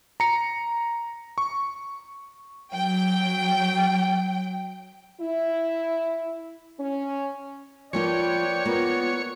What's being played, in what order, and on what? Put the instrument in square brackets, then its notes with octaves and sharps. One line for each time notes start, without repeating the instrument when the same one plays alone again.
[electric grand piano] A#5 C#7
C#6
[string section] F#3 G5
[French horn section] E4
C#4
[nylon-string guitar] F3 A#3 F4 [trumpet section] B4 D5 G5 [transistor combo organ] C#5
[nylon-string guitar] A#3 [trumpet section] B3 [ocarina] F4